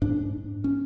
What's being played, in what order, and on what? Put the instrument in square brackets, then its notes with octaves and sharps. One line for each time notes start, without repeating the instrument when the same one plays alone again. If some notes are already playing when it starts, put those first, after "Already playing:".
[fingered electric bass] G#2 D4
C#4